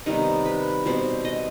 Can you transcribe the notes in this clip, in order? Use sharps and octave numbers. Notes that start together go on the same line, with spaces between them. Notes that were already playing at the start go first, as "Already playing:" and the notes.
C3 D#3 G3 B3 D#4
B4
B2 G3 C4 C5
D#5